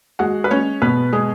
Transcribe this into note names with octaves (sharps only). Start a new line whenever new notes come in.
G#3 F#4 F#5
B4
G#3 C#4 C#5
B2 B3 B4
G#3 B3 G#4